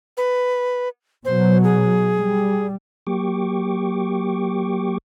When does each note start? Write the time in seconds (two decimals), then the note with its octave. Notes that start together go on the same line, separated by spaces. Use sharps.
0.17 B4
1.25 B2 F#3 C5
1.64 G#4
2.15 G3
3.07 F#3 A#3 G4 G5 C#6 D6